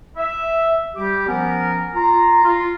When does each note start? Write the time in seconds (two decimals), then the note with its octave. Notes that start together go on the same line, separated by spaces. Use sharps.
0.17 E5
0.95 G3 G4 D6
1.27 F3 B3 C#4 A#4
1.95 F4 A#5
2.43 F4